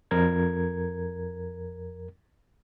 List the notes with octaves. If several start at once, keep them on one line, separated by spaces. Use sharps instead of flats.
F2 A#4 G#6